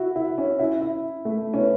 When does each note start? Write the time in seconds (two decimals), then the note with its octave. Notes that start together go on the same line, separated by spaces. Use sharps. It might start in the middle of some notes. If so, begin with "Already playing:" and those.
Already playing: E4 F#4
0.16 E4
0.38 C#4
0.59 E4
0.81 E4
1.25 A3
1.54 C#4
1.58 B3